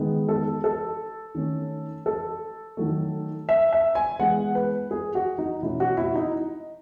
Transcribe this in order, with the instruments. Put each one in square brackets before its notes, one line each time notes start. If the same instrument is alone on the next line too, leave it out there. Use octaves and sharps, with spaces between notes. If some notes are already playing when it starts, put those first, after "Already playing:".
Already playing: [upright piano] D#3 G#3 B3
A4
A4
D#3 A3 C#4
A4
D#3 F#3 A3
E5
E5
G#5
E3 G#3 B3 F#5
B4
G#4
F#4
D#4
B2 A3 C#4 E4
F#4
E4
D#4